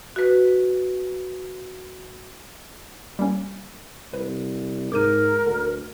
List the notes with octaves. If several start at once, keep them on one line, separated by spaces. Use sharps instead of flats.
F#4 B4
G3 A#3 C#4
C2 B4
G#2 A#4 D6 G6 D#7
D2 D3